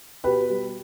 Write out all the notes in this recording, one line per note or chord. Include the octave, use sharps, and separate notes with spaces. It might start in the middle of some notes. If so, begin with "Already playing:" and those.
B2 G4 B4
G3